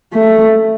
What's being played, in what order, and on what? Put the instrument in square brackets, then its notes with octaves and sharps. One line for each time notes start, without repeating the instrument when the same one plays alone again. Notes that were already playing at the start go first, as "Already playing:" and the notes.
[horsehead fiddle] A3